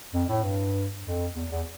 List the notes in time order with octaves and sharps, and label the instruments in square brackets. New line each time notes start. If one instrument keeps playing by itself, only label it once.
[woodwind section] F2
A2
G2
F2
E2
E2